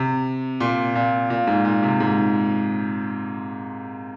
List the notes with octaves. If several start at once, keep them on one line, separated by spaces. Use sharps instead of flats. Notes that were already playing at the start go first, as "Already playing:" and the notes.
Already playing: C3
A#2
A#2
A#2
G#2
A#2
C3
G#2